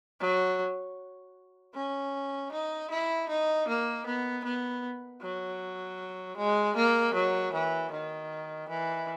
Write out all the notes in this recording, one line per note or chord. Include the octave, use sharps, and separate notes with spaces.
F#3
C#4
D#4
E4
D#4
A#3
B3
B3
F#3
G#3
A#3
F#3
E3
D#3
E3